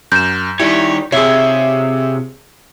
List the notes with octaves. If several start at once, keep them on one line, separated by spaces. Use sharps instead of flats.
F#2 G6 E7
D#3 G3 E4 G4 C#5
C3 F4 G#4 C#5 E5